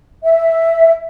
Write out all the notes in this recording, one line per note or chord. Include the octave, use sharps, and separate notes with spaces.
E5